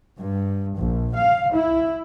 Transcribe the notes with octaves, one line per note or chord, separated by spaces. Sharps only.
G2
A#1
F5
E4